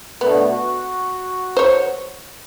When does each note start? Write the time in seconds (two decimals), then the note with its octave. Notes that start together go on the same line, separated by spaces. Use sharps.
0.21 B2 D3 A3 B3
0.49 F#4
1.57 C5 C#5